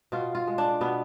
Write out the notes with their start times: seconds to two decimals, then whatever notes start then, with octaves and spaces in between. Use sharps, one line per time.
0.12 B2 F4
0.35 F4
0.47 G#3
0.58 D4
0.81 B2 B3